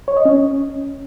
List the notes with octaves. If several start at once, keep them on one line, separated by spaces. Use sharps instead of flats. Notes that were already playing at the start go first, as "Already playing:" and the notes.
C#5
D#5
C#4